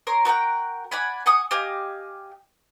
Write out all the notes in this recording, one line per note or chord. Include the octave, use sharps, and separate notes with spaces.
A#4 C#5 C6
F#4 A#4 F#5 G5
D5 F#5 G#5 B5
F#5 G#5 C#6 D#6
G4 D#5 F5 G#5